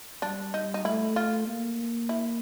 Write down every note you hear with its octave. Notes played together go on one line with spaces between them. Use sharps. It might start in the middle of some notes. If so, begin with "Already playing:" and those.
G3 D4
D#4
D#4
A3 E4
F4
A#3
E4